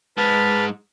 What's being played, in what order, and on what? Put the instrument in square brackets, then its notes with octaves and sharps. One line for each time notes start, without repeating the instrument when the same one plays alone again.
[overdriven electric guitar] G#2 G#3 [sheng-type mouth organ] B4 A5 F6